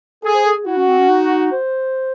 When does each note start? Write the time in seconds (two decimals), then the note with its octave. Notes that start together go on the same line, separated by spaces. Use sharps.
0.23 G#4 A4
0.34 C5
0.45 A4
0.55 G#4
0.66 E4 F#4
0.77 C#4
0.88 C4
0.98 C#4
1.09 D#4
1.52 C5